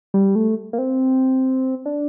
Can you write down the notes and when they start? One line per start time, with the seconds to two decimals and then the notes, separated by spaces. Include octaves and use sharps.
0.14 G3
0.35 A3
0.73 A#3
0.78 C4
1.86 D4